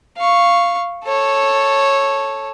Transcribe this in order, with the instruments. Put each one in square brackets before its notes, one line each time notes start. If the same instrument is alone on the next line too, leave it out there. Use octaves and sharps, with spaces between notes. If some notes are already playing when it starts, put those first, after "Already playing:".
[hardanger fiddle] F5 C#6
A4 C#5